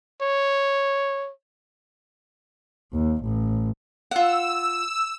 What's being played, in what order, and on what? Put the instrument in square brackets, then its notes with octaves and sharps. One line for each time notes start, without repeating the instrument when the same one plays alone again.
[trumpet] C#5
[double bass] D#2
A1
[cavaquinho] F4 F#5 [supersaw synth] E6